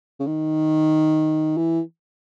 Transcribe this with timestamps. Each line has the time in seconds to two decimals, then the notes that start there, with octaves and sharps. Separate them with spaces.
0.20 C#3
0.27 D#3
1.57 E3